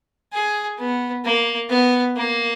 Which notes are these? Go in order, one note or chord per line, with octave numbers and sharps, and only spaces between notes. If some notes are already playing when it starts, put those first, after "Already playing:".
G#4
B3
A#3
B3
A#3